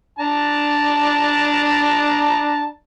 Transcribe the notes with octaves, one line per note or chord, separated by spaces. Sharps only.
D4 A5 A#5